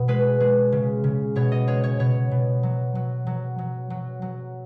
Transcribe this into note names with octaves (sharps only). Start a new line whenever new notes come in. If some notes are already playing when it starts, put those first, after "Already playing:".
Already playing: B2
G#3 B4
G#3
C#3
C#3
B2 C#5
D#5
G#3 C#5
C#5
B2 C#5
B2
F#3
F#3
F#3
F#3
F#3
F#3